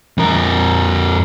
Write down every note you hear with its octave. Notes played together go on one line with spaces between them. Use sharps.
F2 A#4